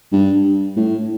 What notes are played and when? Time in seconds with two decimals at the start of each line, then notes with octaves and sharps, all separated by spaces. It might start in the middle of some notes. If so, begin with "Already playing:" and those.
0.12 G2
0.77 A2